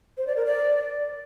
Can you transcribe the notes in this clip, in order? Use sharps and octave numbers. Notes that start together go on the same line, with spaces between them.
C5
D5
A#4
D5